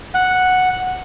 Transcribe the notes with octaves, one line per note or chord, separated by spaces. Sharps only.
F#5